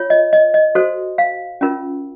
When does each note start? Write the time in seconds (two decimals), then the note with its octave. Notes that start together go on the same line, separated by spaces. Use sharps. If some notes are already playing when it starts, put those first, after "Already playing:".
Already playing: F4 C#5
0.10 D#5
0.33 D#5
0.54 D#5
0.75 F#4 A4 C5
1.18 F5
1.61 C#4 F4 A#4